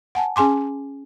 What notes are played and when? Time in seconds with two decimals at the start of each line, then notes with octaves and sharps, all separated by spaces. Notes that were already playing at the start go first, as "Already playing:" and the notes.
0.15 F#5 G#5 A5
0.36 C#4 G#4 G#5 C6 D6